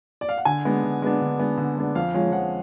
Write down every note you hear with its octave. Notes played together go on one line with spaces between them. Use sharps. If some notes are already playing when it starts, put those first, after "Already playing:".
D5
F5
F#5
D3 G#5
G#3 B3 D4
D3
G#3 B3 D4
D3
G#3 B3 D4
D3
G#3 B3 D4
F2 F5
F3 G#3 C#4 F5
F2 F#5